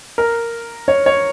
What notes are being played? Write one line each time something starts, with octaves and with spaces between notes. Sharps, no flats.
A#4
C#5
C#5